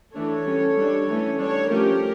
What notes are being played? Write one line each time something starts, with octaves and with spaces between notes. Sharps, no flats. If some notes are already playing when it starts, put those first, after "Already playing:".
E3 A3 D4 A4 C#5
G3 C#4
G3 D4
E3 A3 C#4
G3 D4 A4 C#5
F3 A3 C#4 G4 A#4